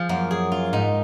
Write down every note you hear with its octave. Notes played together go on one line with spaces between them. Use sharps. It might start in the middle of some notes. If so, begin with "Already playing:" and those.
Already playing: F3 F4 G#4
F#2 A#3
G#4
F4
G#2 D#4